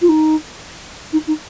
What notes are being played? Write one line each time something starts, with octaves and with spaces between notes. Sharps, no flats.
F4
D#4
D#4
D#4